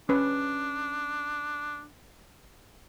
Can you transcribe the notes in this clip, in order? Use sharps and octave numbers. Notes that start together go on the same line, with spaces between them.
C#4 D4 B4